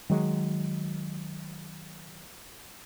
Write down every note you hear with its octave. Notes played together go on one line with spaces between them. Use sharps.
D#3 F#3 G#3